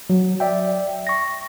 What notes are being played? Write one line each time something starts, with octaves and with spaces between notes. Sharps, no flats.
F#3
D5 E5 G5
C#6 A#6